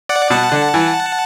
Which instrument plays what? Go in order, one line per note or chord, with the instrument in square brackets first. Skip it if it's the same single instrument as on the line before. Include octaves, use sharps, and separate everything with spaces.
[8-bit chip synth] D5 F#5
[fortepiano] B2 [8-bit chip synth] F#5 A5
[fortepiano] D3
E3